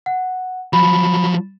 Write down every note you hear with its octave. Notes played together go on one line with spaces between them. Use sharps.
F#5
F3 F#3 B5